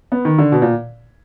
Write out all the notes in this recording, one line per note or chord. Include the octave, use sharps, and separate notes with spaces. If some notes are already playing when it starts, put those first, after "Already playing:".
B3
D#3
D3
B2
A#2